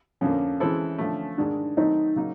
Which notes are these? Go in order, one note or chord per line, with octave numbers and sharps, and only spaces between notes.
F2 D3 F3 A#3 C#4
E3 G#3 C4 E4 A4
D3 F3 A3
G#2 D#3 G#3 D4
D#3 F#3 A3 C4 D#4
C#3 F#3 A#3 D#4